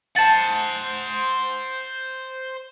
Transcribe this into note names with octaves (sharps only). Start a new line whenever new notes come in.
C5 F#5 A5 A6